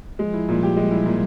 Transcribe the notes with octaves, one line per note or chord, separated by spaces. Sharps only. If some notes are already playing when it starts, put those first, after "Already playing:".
F3 G#3
E4
A#2 G3
G4
F3 G#3
E4
A#2